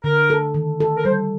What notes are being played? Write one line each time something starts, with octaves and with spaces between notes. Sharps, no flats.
D3 A#4
A4
D#3
A4
A#4
G3 C5